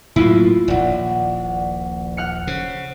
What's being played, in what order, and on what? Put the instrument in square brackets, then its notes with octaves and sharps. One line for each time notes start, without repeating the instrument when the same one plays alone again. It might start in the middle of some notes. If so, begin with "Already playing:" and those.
[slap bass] A2 F#3 A#3 [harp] E4 F4
[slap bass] D#1 A#1 [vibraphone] D5 F#5
[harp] F#5 F6 C#7
[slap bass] C#3 [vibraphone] C5